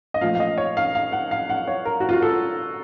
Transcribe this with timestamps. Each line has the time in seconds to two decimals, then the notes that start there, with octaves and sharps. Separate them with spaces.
0.14 D#5
0.21 A#2 F3 A3 F5
0.35 F5
0.40 D#5
0.58 C#5
0.77 F5
0.95 F5
1.12 F#5
1.31 F5
1.50 F#5
1.68 C#5
1.85 A#4
2.00 F#4
2.09 F4
2.13 F#4
2.22 A4